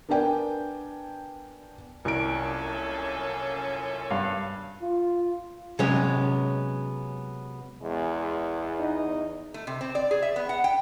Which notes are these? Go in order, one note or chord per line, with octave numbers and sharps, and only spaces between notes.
B3 D4 A#4 D5 G5 G#5
C2 F#2 A#2 C#4 A4 D7
G2 F5
F4
C3 F#3 G#3 B3 C#4
E2 G#3
D#4
A3
C3
C4
D5
G#4
E5
B3
F#5
G5